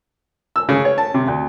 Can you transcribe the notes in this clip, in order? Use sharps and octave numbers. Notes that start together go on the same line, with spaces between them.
E6
C#3
C#5
A5
C3
D2